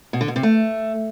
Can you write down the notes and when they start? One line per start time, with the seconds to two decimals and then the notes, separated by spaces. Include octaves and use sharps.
0.13 B2
0.21 D3
0.28 B2
0.36 C3
0.43 A3